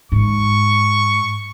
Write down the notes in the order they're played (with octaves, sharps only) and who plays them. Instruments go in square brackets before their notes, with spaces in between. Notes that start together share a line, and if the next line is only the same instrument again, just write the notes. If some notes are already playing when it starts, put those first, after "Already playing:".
[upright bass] G#2 [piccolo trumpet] C#6